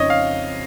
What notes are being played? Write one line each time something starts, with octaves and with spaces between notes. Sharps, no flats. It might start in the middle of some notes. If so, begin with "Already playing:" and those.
Already playing: F2 C#3 C4 D#4 C#5 D#5
F5